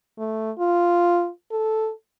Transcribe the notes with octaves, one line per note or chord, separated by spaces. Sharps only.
A3
F4
A4